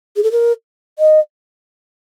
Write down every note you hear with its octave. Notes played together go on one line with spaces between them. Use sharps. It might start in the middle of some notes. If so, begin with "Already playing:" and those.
G#4
A4
A#4
D#5